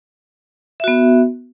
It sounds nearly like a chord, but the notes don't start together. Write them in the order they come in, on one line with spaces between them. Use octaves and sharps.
E5 F#4 B3